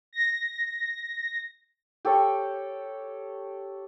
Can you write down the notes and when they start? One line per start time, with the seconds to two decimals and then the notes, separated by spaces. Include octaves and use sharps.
0.13 A#6
2.05 G4 A4 C#5